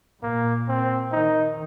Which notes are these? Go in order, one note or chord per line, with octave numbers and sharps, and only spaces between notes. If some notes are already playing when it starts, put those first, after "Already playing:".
A#2 A#3
C4
D#3 D#4